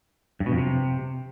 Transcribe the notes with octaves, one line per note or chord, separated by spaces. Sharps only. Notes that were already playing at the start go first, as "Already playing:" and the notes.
G2
B2
F2
C3